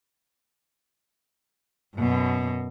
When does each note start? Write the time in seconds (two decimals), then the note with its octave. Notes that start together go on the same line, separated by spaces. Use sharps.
1.96 F#2 B2